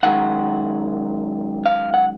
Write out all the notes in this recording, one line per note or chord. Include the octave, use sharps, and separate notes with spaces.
F#2 D#3 G#3 F#5
F5
F#5